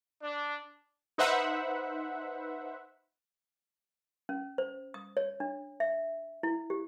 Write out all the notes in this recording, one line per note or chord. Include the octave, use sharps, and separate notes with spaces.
D4
D#4 B4 C5 E5 F#5
C#4
C5
D#6
C#5
D4
E5
E4
G4